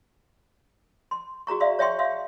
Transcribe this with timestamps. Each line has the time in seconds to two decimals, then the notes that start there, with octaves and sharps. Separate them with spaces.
1.11 C6
1.47 F#4 G#4 A#5 C#6
1.60 D5 E5 F5 C6
1.79 C#5 E5 G5 C6 C#6
1.99 E5 F5 C6